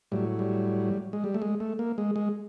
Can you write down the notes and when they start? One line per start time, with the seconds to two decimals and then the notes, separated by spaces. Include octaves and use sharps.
0.12 A2 F#3 G3
0.39 G3
1.13 G#3
1.24 G3
1.34 A3
1.42 G#3
1.60 A3
1.79 A#3
1.98 G#3
2.16 G#3